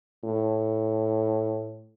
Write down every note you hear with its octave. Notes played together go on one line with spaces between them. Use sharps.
A2